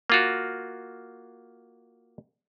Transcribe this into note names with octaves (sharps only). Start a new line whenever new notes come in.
A#3 F4 F#4